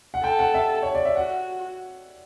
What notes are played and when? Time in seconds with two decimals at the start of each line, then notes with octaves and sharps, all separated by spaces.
0.14 F#5
0.24 A4 G5
0.39 F#5
0.54 E5
0.82 C#5
0.95 D5
1.05 E5
1.16 F#4 F#5